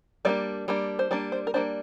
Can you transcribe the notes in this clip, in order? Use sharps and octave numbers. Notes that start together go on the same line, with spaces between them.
G3 A#3 D4 D5
G3 A#3 D4
C5
G3 A#3 D4 D5
C5
A#4
G3 A#3 D4 C5